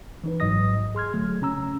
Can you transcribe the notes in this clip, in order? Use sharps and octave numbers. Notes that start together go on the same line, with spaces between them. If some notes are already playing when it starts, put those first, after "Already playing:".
E3 D#4 B4
A1 G#2 F#3 D#5 D#6 A#6
G#4 C6 F6 G#6
D3 F#3 A3
C#3 C#4 A#5 E6